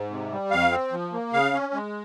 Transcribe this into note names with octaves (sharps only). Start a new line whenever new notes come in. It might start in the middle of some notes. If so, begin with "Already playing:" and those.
Already playing: G#2
C3
G3
F2 F5
C4
F3
A#3
C#3 F5
C#4
G#3